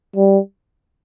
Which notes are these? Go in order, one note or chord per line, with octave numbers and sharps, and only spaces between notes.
G3